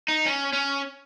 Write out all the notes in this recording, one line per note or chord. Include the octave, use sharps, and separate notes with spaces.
D#4
C#4
C#4